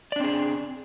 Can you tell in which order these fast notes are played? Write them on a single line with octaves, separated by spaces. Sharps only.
D5 D4 C4 G#4